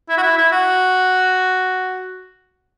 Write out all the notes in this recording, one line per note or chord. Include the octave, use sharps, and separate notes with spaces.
E4
F#4
E4
E4
F#4